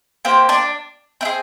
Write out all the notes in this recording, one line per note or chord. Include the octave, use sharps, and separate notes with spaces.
A#3 C4 G4 C5
D4 D5
C4 E4 G#4